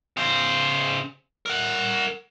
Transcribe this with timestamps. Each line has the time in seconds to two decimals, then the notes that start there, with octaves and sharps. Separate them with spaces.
0.17 C#3 C5
1.46 A#4 F#5